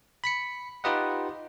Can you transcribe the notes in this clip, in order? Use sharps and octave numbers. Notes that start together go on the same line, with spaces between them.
B5 B6 C#7
D#4 F4 G4 B4 D#5 F#5